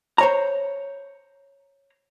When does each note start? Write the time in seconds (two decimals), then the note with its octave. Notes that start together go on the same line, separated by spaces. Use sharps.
0.18 C5 C#5 A#5